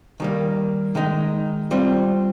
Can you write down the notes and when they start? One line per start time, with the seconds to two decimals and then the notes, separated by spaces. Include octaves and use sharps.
0.20 D#3 G3 A#3
0.95 D#3 G#3 D#4
1.71 G3 C4 F4